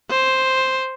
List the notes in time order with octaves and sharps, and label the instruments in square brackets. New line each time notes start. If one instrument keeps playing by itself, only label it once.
[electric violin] C5